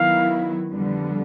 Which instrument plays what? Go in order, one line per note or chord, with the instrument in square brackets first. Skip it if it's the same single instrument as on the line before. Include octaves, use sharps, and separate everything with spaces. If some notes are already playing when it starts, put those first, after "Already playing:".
Already playing: [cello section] D#3 F#3 B3 E4 [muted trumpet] F5
[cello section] F2 D3 G3 B3